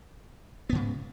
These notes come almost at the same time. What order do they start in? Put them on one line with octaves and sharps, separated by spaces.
B3 G#2 C#3